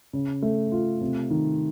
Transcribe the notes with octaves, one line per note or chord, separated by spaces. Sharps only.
C#3
A3
F4
C3
D#3